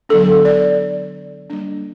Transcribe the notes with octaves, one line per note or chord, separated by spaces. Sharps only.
D3 F#3 B3 D4 A4
D5
G3 A#3 D4